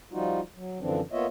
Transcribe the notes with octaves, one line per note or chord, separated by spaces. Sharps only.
F3 G3 D#4 F4 F#4
F#3
F#2 D3 E3 F3 C4 D4
A#3 B3 F4 C#5 D#5 E5